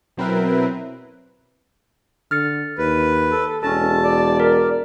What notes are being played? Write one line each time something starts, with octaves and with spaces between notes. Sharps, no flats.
B2 F#3 C4 E4 A#4 B4
D3 F6 A6 C#7
D#2 B4
A4
E1 C#4 A4 A5
D5
A#4